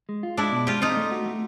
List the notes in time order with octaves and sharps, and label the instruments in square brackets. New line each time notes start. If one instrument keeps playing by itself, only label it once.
[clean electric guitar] G#3
F4
[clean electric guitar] G#3 [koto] D4 E4
[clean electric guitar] B2
[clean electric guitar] G#3 [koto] F4 G4
[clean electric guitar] C4 [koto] D#4 F4
[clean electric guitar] A3
F#4
A3